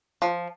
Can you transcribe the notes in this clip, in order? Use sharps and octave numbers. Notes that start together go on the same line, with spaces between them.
F3